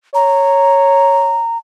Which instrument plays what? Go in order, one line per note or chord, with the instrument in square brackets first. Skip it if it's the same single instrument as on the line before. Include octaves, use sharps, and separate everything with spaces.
[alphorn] C#5 [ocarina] A#5